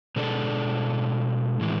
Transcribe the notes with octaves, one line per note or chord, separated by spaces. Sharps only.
B2 G#3 D4 A4 D5
A2 E3 G#3